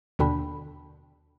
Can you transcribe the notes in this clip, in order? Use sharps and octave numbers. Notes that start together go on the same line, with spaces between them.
D#2 B2 D3 D4 G5 B5